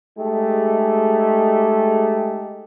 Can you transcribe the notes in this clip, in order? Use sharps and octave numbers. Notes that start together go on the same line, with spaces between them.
G#3 A3 D#4 G4 G#4